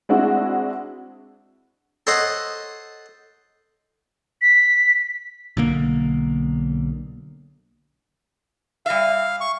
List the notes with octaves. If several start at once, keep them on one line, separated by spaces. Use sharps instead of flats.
G#3 C4 D4 E4 F#4 G#4
A4 C5 C#5 D#5 F#5
B6
B1 D3 A#3
G3 E5 F5
C#6